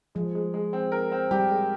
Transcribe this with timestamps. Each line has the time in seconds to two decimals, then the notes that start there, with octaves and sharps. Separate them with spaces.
0.15 F3 G#3
0.35 G#3
0.54 G#3
0.73 C4
0.92 A#4
1.12 C4
1.31 G3 G4
1.50 G#3